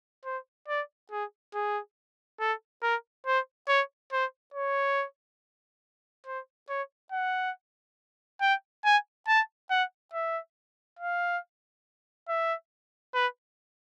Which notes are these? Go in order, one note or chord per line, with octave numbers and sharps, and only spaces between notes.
C5
D5
G#4
G#4
A4
A#4
C5
C#5
C5
C#5
C5
C#5
F#5
G5
G#5
A5
F#5
E5
F5
E5
B4